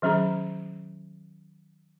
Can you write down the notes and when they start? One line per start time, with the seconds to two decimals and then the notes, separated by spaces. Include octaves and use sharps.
0.02 D#3 F#3 C#4 G#4 A#5